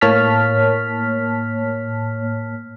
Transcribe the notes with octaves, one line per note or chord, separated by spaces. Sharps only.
A2 A#3 C#5 A5 F6 B6